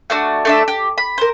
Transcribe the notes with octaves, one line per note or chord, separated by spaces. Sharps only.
A3 D4 F#4
A3 D4 E5
G4
B5
A#4 C5